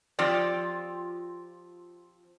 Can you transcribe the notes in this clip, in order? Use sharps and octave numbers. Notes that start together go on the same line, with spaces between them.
F3 C4 F4 G4 D5